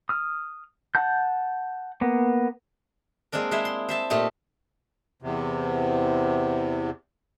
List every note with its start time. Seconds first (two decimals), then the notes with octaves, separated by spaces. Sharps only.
0.09 D#6 F6
0.95 F#5 A5 G6
2.01 A#3 B3
3.32 G#3 A#3 C4 D4 A#4
3.51 G#3 E4 C5 E5
3.65 C6
3.89 C5 E5 A5
4.10 A#2 A3 D#4 G4
5.22 E2 C3